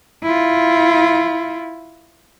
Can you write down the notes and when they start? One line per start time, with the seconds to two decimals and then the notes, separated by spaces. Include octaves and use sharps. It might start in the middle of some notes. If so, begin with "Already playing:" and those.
0.23 E4 F4